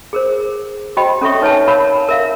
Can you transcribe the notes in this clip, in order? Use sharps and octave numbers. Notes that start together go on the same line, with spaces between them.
G#4 A#4 C5
F#4 C5 D#5 G5 B5
C#4 A4 C#5 E5 C#6
D#4 B4 C#5 G#5 A5
A#4 C#5 F5 B5
A#4 E5 F5